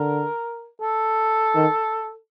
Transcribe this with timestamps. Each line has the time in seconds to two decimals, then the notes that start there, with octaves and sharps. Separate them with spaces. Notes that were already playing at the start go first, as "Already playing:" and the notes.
Already playing: D3 A#4
0.82 A4
1.55 D#3